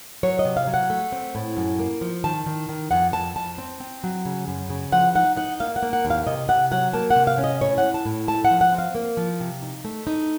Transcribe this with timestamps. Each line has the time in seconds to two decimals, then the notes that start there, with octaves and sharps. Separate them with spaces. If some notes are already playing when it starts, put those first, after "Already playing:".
0.23 F#3 C#5
0.39 D#5
0.45 C3
0.57 F5
0.67 F#3
0.74 F#5
0.90 A3
1.12 C4
1.35 A2
1.57 F#2
1.79 A#3
2.01 F3
2.24 D#3 A5
2.46 D#3
2.69 D#3
2.91 F2 F#5
3.13 F2 A5
3.36 F2 A5
3.58 C4
3.80 C4
4.04 F#3
4.25 C#3
4.48 F#2
4.70 C#3
4.92 F3 F#5
5.15 D#4 F#5
5.36 D#4 F#5
5.60 A#3 F5
5.76 F#5
5.83 A#3
5.93 F#5
6.05 D#2
6.10 F5
6.27 C3 D#5
6.49 C3 F#5
6.71 F#3 F#5
6.93 A#3 A5
7.10 F#5
7.16 C3
7.27 F5
7.38 C#4
7.44 D#5
7.61 A2 C#5
7.78 F#5
7.83 A2
7.94 A5
8.06 A2
8.28 A3 A5
8.45 F#5
8.51 F3
8.61 F#5
8.72 C4
8.78 F5
8.95 A#3
9.17 F3
9.40 C3
9.62 D#4
9.85 A3
10.07 D#4